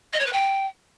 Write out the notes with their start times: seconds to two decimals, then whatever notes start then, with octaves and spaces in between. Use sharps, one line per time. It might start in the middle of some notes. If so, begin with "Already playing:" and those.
0.13 D#5
0.19 C#5
0.26 B4
0.32 G5